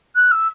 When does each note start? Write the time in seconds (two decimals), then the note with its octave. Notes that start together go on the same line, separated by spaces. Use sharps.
0.15 F#6
0.31 E6